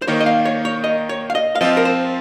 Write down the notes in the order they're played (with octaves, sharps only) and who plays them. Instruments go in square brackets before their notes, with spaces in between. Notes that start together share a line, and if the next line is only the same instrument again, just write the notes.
[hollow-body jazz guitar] C5
[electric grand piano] D#3 A#3 D#4 [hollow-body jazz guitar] C#5
[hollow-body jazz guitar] D#5
F5
C#5
C#5
D#5
C#5
F5
D#5
F5
[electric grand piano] F3 C4 F4 [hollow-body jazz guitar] D#5
[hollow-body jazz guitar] A#4
C5